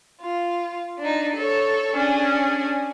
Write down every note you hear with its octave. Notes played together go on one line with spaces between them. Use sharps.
F4
D4 D#4
A4 C#5
C#4 D4 G#4